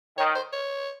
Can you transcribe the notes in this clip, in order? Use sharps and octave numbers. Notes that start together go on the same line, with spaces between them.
D#3 C#5
C5
C#5